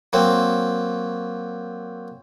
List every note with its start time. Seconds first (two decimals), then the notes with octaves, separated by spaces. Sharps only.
0.13 F#3 A#3 C4